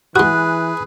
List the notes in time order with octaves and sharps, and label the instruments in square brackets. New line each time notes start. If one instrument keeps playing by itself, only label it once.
[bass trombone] E3 [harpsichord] G#3 F#4 [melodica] G#4 B4 [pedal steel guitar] F#6